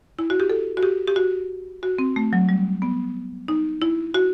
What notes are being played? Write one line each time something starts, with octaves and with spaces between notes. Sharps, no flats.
E4
F#4
G4
A4
F#4
G4
G4
F#4
F#4
C4
A3
F#3
G3
B3
D#4
E4
F#4